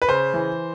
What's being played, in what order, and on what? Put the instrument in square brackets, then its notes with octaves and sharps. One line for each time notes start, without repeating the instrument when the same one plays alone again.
[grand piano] B4
C#3 C5
E3